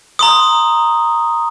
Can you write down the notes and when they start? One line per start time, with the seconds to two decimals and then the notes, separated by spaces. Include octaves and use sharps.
0.19 A#5 C6 D#6